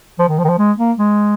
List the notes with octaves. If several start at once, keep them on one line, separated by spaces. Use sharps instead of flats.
F3
D#3
F3
D#3
F3
G#3
A#3
G#3